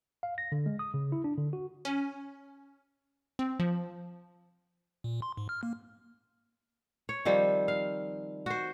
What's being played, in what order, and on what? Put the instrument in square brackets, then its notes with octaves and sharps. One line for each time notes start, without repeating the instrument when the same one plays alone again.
[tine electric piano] F5
A#6
D3
G#3
D#6
C#3
E4
D4
D3
F#4
[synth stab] C#4
C4
F3
[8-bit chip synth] A#2
C6
G#2
F6
A#3
[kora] C#5
D#3 F3 G3 C4
F5
F#4 C5